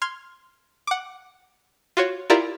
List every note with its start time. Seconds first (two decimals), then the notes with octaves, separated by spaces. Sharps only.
0.02 C6 F6 G#6
0.87 F#5 D6
1.97 F4 F#4 C#5
2.30 E4 F4 G4 A#4 D5 A#5